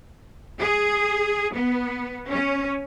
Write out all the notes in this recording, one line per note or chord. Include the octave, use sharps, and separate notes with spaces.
G#4
B3
C#4